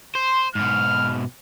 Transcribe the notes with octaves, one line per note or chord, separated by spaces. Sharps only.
C5 C6
G#2 B2 F6